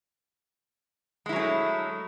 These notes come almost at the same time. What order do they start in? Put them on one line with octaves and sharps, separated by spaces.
G#3 E4 F#3 C#4 A3